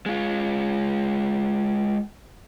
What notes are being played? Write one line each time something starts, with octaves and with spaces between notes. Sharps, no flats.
G#3 F4